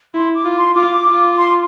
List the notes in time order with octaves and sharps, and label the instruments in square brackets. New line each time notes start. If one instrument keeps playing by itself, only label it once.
[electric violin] E4 [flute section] C6
[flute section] D6
[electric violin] F4
[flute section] C6
[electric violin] F4 [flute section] D6
[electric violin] F4
[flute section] C6